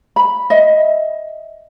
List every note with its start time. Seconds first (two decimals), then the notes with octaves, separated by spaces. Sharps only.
0.16 B5
0.50 D#5 E5